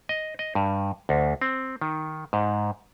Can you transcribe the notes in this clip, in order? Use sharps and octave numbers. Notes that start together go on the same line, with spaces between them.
D#5
D#5
G2
D2
C4
D#3
G#2